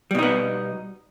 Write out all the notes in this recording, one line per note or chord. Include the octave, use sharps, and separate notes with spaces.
B2 G3 B3 D#4